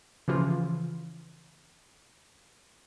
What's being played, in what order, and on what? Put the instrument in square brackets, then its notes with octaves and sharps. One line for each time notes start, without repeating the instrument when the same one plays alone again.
[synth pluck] C#3 E3 F3 F4